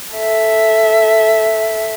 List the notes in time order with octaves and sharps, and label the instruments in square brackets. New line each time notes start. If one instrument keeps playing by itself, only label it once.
[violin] A4 E5